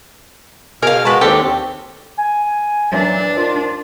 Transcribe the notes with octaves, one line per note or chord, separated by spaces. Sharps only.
B2 G#4 A#4 F5 F6
G#3 F#4 B4 A5
D#2 C4 D4 G4 A4
G#5
A#2 E3 F#3 D4
D#3 F3 F4